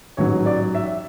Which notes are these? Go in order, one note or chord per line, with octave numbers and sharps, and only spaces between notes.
A1 G#2 F#3 C#5
D5
E5